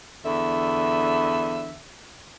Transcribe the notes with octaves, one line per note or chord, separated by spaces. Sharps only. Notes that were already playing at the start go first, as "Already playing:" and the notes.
E2 D3 E5